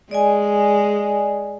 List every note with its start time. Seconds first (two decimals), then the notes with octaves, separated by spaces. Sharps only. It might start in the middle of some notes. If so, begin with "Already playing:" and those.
0.11 G#3 D5 D#5 G#5